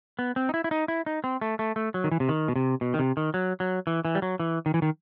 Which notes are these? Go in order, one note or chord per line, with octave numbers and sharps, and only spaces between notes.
B3
C4
D#4
E4
E4
D#4
E4
D#4
C4
A3
A3
A3
F#3
D#3
E3
C3
D#3
B2
C3
B2
D#3
C3
D#3
F#3
F#3
E3
E3
G3
F#3
E3
D#3
E3
D#3